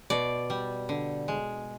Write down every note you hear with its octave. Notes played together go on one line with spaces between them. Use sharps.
B2 D5
G3
D3
G#3